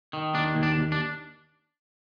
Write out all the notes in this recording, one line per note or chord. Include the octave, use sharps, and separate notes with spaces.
D#3
D#2 D4
D#2
D4
D#2
D4